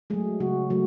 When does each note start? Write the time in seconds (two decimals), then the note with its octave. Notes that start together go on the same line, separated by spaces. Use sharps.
0.10 F#3 G#3 A3 G#4
0.40 C#3 F#3 F#4
0.70 F#3 A3 F#4